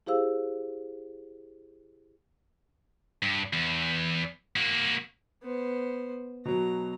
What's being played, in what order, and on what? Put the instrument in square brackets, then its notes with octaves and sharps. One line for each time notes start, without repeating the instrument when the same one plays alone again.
[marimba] E4 G4 G#4 C5 F5 E6
[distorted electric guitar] G2
E2
A#3 F#4
[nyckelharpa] B3 C5
[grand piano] B2 F#3 [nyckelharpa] A#5